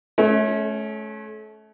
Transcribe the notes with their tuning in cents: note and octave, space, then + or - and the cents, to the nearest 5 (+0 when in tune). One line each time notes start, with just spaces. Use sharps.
A3 -35 C#4 +0